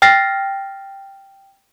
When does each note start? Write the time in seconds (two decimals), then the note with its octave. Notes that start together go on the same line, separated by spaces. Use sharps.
0.02 G5 F6 A6 A#6 C7